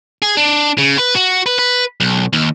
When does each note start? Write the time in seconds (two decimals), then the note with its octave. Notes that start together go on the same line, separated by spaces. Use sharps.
0.22 G#4
0.37 D4
0.78 C#3
0.98 B4
1.15 F#4
1.46 B4
1.59 B4
2.00 B1
2.33 D#2